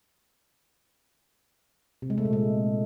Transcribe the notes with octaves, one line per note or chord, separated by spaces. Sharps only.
C3
G#3
A3
A#2
G#3